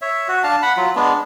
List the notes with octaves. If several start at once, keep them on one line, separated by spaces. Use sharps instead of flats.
C#5 E5
F#4
D4 F5 A5
F#5 B5
F#3 F4
G#3 B3 D4